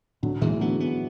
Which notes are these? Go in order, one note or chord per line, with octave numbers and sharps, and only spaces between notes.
A2 D3 F#3
A2 E3 G#3
D3 F#3 B3
B3